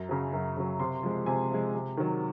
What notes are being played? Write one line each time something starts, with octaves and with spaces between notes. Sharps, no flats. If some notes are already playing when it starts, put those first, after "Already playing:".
Already playing: F#2 A#5
C#3 F#3
F#2
C#3 F#3
C3 C6
F3 G#3
C3 G#5
F3 G#3
C3
D#3 F#3